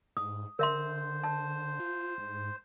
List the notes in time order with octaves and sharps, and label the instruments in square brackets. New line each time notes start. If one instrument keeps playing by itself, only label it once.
[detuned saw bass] G#2 [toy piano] D#6
[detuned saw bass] D3 [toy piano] A#4 E5 C6 [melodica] C5
[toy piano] A5
[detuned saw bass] F4
G#2